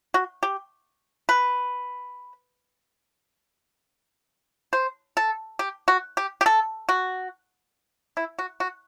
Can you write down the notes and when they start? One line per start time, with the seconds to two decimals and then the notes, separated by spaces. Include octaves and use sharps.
0.14 F#4
0.43 G4
1.29 B4
4.73 C5
5.17 A4
5.59 G4
5.88 F#4
6.17 G4
6.41 G4
6.46 A4
6.89 F#4
8.17 E4
8.39 F#4
8.60 F#4